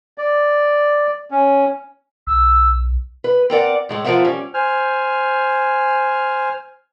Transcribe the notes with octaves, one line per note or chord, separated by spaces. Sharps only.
D5
C#4
B1 E6
B4
C4 A#4 D5 F#5
A2 G#3 A3
F3 B3 A#4 C5 E5 F#5
G3 C#4
C5 G#5 F6